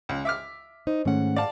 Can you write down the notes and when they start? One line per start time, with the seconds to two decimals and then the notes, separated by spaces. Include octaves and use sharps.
0.09 C#2
0.25 E5 D6 F6
0.87 D#4 C5
1.05 G#2 D#3 A3 C#4 F#5
1.36 D5 F5 A5